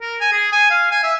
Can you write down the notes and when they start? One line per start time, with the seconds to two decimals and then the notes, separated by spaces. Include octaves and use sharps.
0.01 A#4
0.21 G#5
0.32 G#4
0.52 G#5
0.70 F5
0.91 G#5
1.03 E5